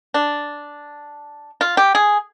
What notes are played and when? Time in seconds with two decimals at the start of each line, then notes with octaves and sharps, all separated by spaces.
0.14 D4
1.61 F4
1.77 G4
1.95 G#4